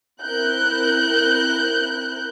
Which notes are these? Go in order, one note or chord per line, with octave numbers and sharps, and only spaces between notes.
C4 E4 A#4 F#6 G6